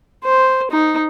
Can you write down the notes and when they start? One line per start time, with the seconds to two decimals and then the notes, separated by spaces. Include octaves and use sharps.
0.24 C5
0.71 D#4